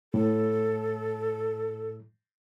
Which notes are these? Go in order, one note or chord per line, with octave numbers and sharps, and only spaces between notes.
A2 A4